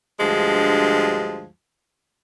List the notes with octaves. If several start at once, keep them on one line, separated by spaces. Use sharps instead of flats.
D2 G2 F3 G#3